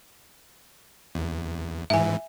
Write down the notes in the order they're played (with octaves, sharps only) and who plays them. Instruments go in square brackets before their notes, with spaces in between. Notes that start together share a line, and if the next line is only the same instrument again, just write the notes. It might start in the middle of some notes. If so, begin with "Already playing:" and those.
[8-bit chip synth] E2
[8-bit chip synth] G#2 E3 [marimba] E5 G#5